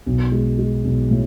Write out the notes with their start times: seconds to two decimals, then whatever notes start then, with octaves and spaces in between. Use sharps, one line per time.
0.06 B1
0.32 G#3
0.59 G#3
0.85 B1
1.11 A2